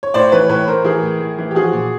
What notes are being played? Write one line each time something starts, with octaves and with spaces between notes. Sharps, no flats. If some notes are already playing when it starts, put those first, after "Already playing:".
C#5
A2 C5 D5
E3 B4 C#5
A2 B4 C#5
A2 A#4 C5
E3 G#4 A#4
A2
A2
E3
G4
F3 F#4 G#4
A#2